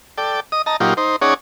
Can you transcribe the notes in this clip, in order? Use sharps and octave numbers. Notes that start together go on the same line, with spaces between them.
A4 D5 G5
D#5 D#6
D#5 A5 A#5
A#2 F#3 D#4 F4 G4
D#4 C5
C#4 D#4 G#4 C#5 D5 F#5